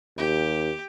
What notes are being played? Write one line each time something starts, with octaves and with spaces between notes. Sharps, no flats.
D#2 G4